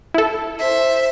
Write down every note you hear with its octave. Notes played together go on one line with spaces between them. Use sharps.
E4 A4
C5 E5